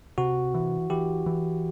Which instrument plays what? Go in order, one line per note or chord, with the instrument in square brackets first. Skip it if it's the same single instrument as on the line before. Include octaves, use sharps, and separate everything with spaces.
[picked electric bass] C3 [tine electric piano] F#4
[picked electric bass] E3
[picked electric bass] E3 [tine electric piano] G4
[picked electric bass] E3